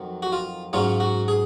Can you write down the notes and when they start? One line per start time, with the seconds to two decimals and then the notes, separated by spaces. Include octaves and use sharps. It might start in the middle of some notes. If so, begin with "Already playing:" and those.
Already playing: F2 D#3 F#3
0.22 F#4
0.32 F4
0.73 G#2 F#3 C#4 F4
1.00 F#4
1.28 G#4